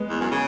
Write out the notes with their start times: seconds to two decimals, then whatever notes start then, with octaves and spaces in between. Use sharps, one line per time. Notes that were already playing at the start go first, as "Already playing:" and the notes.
Already playing: G#3 B3
0.09 E2
0.20 F#2
0.31 C#3